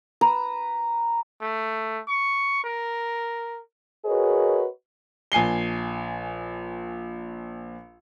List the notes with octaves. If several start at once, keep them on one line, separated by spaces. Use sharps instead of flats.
B4 A#5 E6
A3
C#6
A#4
F#4 G#4 A#4 B4 C#5 D#5
A#1 G#5 C7 G7